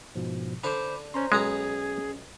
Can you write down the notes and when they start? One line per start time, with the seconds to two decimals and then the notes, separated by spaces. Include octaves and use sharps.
0.16 G#2 B2 F3
0.64 D3 D4 C5 B5 D6
1.14 C#4 C5 A#5 C6
1.32 B1 G#3 B3 C#4 G#4 A#5